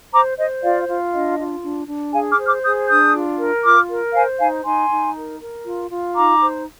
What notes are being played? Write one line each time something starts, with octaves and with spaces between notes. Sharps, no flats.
C5 A#5 D6
C5 D#5
F4 D5 F5
F4
D4 D#5
F4
D4
D4
G#4 F5 G#5
D6 F6
C5
D6 F6
G#4 D#6 G6
D4 D#6 G6
F4
A#4
F4 D6 F6
A#4
C5 F5 G#5
D#4 F5 G#5
D#4 G#5 C6
D#4
A#4
A#4
F4
F4
D#4 A#5 D6
C5